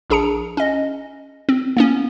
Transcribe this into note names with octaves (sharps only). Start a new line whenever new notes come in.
A#1 D4 G#4 A#5 C#7
C#4 D#5
C4
A#3 B3 C#4